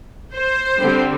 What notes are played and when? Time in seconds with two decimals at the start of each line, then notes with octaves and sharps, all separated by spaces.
0.33 C5
0.80 D3 G3 C4